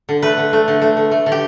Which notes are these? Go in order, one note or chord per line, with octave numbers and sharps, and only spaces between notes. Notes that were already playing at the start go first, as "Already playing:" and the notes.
D3
A3 B4
D3
A3
D3
A3
D3
A3
D3
G4